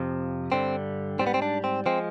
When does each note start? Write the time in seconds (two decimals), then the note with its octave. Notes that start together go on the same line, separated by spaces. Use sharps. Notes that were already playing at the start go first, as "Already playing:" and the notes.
Already playing: F2 C3 F3
0.52 G2 D3 G3 C4
1.19 G#2 G3 C4
1.27 B3
1.34 C4
1.42 D4
1.64 C4
1.86 F3 G#3 C4